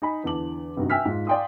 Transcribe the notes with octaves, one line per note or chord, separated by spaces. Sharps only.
D#4 D#5 G#5 B5
E2 D3 E3 A5 D6 F#7
G1 G2 C3 D#4 F#4
E5 G5 G#5 E6 F6 B6
G#2 F4
D5 F5 G5 G#5 C6 D#6